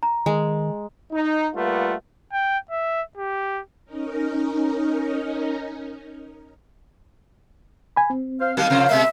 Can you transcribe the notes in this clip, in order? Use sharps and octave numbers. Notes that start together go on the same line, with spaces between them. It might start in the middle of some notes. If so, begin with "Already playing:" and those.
A#5
D#3 G#3
D#4
G3 A3 A#3 F4 B4 F#5
G5
E5
G4
C#4 D#4 A#4
G#5 B5
C4
C5 F5
D#3 F#3 A#3 F5
C3 F3 C5
B2 G#3 A#3 E5